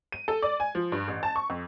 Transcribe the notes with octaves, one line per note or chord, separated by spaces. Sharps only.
D#7
A4
D5
G#5
F3
G2
A1
A5
C#6
F2